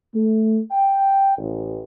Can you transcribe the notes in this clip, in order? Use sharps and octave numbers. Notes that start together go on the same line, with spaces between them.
A3
G5
A1